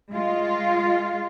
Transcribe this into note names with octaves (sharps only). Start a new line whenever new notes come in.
G#3 F4